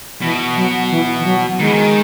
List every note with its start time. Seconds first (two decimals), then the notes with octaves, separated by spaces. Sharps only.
0.21 B2 E3
0.56 F#3
0.90 E3
1.19 E3
1.25 F#3
1.59 D#3 G#3
1.67 E3
1.74 D#3